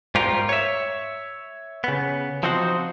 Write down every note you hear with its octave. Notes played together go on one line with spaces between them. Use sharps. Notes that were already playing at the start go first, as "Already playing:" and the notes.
G#2 G3 F4 G4 A#4
C#5 E5
C#3 B3
F3 C4 D#4 F#4 C5